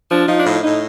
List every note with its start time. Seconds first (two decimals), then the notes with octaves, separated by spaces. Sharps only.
0.11 F3 D4
0.28 F3 D#4
0.38 D4
0.46 A2 D#4
0.64 A2 D#4